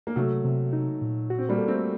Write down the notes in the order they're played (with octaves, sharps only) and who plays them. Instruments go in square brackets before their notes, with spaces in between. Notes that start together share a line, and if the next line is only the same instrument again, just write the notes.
[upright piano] A#3
[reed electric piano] C3 [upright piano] F#3 A3
[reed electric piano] C3
D#4
A#2
F#4
[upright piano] C4
G3 A#3
[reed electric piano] A4
[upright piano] A3 C4